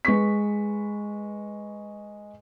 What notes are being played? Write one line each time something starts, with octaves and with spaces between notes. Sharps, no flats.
G#3 B4 C#6 B6